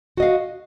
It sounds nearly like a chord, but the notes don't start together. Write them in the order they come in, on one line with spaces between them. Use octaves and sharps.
F#4 D#5 F5